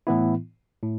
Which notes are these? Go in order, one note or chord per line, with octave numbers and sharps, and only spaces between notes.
A2 E3 B3 E4
A2